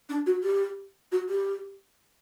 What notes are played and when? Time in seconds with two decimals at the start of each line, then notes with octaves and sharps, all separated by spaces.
0.10 D4
0.27 F#4
0.43 G4
1.12 F#4
1.29 G4